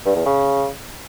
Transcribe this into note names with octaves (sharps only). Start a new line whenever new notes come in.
G2
E2
C#3